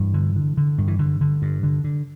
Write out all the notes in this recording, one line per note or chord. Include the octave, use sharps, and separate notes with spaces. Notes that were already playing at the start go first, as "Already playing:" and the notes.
Already playing: G2 E3
D3
D3
D3
G2
E3
G2 D3
D3
G2
D3
D3